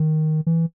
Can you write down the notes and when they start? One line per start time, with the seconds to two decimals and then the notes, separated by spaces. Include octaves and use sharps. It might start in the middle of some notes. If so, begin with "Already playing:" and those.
Already playing: D#3
0.47 E3